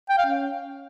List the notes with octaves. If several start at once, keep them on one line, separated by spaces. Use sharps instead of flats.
G5
F5
C#4